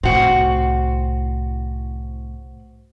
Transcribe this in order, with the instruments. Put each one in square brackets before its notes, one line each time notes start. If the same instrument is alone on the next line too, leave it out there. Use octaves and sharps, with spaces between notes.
[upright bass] C2 A2 [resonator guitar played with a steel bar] C4 F#4